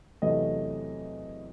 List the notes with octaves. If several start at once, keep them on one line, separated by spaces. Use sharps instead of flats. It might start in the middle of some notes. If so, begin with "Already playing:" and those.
E2 C3 F#3 A3 B4 D#5